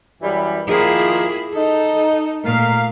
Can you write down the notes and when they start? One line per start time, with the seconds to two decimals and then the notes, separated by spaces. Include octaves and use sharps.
0.22 F#2 E3 G3
0.68 D#3 F3 A#3 E4 G#4
1.55 D#4 A4
2.45 A#2 A3 A#4 F5